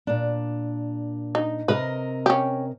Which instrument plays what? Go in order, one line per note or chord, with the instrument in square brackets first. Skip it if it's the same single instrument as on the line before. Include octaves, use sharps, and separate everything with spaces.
[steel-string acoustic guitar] A#2 D4
[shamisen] D#4
[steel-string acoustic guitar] C3 A#4 D#5 [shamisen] B4
[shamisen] C#4 G4